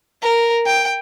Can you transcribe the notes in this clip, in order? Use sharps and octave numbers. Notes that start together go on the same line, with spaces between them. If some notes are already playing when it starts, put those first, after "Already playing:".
A#4
G5